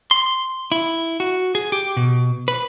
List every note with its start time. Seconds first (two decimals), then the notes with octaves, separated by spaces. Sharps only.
0.11 C6
0.72 E4
1.20 F#4
1.55 G#4
1.72 G4
1.97 B2
2.48 B4